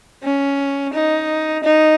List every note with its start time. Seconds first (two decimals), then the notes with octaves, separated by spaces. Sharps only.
0.24 C#4
0.93 D#4
1.64 D#4